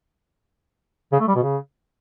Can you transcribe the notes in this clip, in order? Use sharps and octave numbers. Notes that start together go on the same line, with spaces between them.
C#3
A3
G3
B2
C#3